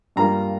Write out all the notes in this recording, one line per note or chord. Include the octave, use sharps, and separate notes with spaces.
G2 G3 A#3 F4 A#5